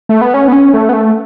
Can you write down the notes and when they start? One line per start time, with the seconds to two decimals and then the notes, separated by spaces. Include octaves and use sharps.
0.09 A3
0.21 B3
0.34 C#4
0.48 B3
0.53 C#4
0.74 A3
0.89 B3
0.93 A3